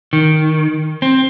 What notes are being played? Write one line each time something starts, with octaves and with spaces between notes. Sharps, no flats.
D#3
C4